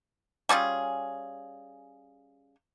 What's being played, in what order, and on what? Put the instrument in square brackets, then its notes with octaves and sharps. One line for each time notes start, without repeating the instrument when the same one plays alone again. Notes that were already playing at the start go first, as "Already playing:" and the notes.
[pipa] G3 C#4 F4 G#4